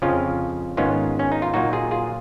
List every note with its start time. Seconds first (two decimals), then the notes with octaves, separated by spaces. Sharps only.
0.02 F2 C#3 F3 C#4 F4
0.77 G#2 D#3 G#3 B3 C#4 F4
1.19 C#4
1.32 D#4
1.42 F4
1.54 A#2 F#3 A#3 D#4 F#4
1.73 F4 G#4
1.91 F4 G#4